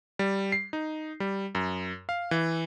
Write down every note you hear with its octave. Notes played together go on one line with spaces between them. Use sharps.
G3
C7
D#4
G3
F#2
F5
E3